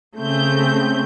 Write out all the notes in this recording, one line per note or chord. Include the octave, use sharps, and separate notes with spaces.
C#3 A3 C4 G6